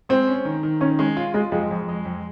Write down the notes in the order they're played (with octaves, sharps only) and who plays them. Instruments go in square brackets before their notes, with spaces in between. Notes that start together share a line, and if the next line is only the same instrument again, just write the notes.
[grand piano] G#3 [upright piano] C4
[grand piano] C#4
D#3
D#3
[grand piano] D#3 [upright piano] C#4
[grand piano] G#3 [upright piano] C#4
[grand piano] F4
[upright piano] G#3 [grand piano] F4
[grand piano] F2 [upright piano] G#3
[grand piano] F2
G#3
F2